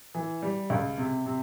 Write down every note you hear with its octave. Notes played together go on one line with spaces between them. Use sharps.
E3
G3
C#2
C3
C3